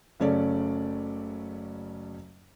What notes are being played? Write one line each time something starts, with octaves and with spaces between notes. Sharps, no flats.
F#1 C#3 A3 C#4 D5